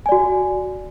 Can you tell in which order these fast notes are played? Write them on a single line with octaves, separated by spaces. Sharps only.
G#5 D5 F#4